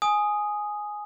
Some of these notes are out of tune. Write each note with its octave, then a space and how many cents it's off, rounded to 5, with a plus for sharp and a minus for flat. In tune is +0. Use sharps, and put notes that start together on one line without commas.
G#5 +5 D#6 +0